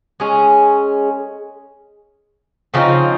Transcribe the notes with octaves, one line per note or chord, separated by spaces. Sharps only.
G#3 C#4 G#4
C#3 F3 C4 D#4